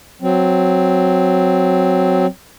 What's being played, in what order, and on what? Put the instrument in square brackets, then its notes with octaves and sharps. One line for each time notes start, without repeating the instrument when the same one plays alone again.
[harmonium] F#3 C4